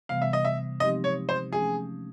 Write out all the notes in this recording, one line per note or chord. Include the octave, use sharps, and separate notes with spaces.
C3 E3 G3 B3 F5
E5
D#5
E5
F3 G#3 C4 D#4 G4 D#5
C#5
C5
F3 A3 C#4 G#4